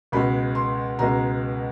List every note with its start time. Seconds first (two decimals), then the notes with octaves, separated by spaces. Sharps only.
0.12 C#2 B2 G#3 B5
0.55 C6
0.99 C#2 B2 G#3 A#5